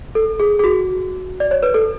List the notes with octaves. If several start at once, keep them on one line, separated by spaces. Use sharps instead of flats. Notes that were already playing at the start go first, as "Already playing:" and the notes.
A4
G#4
G#4
F#4
D5
C#5
B4
A4